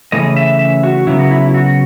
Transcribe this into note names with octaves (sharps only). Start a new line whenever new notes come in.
C#3 E3 A3 C#4 D#5
E5
E5
F#4
C#3 F#3 B3 E4
F#4
E4
E4
F#4